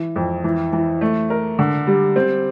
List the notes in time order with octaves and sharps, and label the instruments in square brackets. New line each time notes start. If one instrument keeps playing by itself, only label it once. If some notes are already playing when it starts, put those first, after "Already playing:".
Already playing: [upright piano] E3
F2
E3
E3
A3
A#4
D3
G3
C4